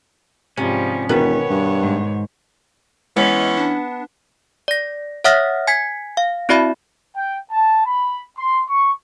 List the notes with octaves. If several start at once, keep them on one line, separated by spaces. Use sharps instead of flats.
G#2 C3 F3 G3 C#4
E1 B2 D#3 B3 B4 C#5
G2
G#2
E3 G#3 B3 C#4
D4
D5 A#6
C#5 E5 F#5 D#6 F6 A#6
G#5 G#6 B6
F5
C4 E4 F#4 D5 E5 B5
G5
A5
B5
C6
C#6